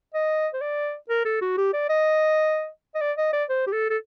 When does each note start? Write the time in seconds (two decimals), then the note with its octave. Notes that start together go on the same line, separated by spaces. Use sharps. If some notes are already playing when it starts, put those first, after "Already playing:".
0.14 D#5
0.54 C5
0.61 D5
1.09 A#4
1.25 A4
1.41 F#4
1.57 G4
1.73 D5
1.89 D#5
2.95 D#5
3.01 D5
3.17 D#5
3.33 D5
3.49 C5
3.67 G4
3.73 A4
3.90 A4